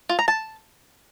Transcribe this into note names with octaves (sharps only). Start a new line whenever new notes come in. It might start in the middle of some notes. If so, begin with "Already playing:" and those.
F4
A#5
A5